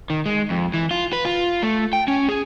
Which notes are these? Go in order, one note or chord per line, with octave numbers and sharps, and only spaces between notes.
D#3
G#3
F2
E3
F4
B4
F4
A3
G5
C#4
G#4